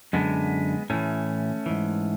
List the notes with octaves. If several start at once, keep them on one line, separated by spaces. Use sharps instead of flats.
F#2 D3 G#3 B3
A2 E3 A3 C#4
G#2 E3